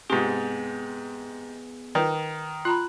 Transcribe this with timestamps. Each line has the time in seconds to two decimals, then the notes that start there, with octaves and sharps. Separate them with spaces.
0.10 G#2 C3 B3 G#4
1.95 D#3 B4
2.65 F4 A#5 B5 F#6